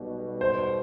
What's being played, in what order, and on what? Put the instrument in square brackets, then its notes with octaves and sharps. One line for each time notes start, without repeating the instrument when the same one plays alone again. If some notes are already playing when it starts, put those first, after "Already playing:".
Already playing: [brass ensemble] B1 B2 G3
[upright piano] C5